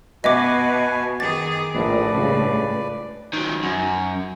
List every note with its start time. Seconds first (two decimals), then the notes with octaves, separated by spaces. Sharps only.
0.24 B2 F#4 B4 D#5 E5 G#5 D6
1.20 D#3 G#4 D6 A6
1.74 A#1 A2 B4 D5
2.13 C#2 G2 C#3
3.33 D#3 F#3
3.63 F#2